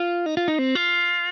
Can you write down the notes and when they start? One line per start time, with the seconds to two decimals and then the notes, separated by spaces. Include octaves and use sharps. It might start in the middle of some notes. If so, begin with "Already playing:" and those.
Already playing: F4
0.26 D#4
0.37 F4
0.48 D#4
0.59 C4
0.75 F4